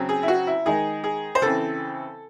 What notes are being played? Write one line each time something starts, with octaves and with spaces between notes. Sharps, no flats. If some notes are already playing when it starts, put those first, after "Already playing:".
Already playing: C#3 F#3 C4
G#4
E4
F#4
E4
D#3 G#3 D#4 G#4
G#4
C5
C#3 E3 C4 A4